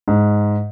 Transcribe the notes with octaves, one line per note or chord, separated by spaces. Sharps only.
G#2